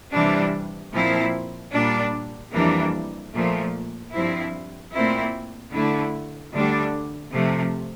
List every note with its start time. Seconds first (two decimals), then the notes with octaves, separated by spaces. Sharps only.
0.13 C3 E3 G3 D4
0.93 A#2 F3 C4 E4
1.73 A#2 G3 D4
2.52 F2 E3 G3 A#3 D4
3.32 A#2 F3 A3
4.12 G2 F3 C4 E4
4.92 A#2 A3 C4 E4
5.72 D3 A3 E4
6.52 D2 D3 G3 D4
7.32 C3 F3 A3